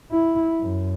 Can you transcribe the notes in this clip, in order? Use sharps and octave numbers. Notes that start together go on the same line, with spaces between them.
E4
F#2